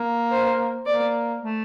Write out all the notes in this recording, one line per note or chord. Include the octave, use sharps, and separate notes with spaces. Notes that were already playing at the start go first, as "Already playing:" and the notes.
Already playing: A#3
C5
A#3 D5
A3